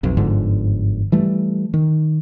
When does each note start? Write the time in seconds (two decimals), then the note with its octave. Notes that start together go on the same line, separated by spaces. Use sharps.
0.03 B1 F2
0.17 G1 G#2 D3 F3
1.12 E3 G3 A3
1.74 D#3